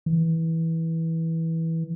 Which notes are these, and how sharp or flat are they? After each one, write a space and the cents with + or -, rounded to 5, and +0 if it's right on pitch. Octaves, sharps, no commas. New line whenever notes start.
E3 -15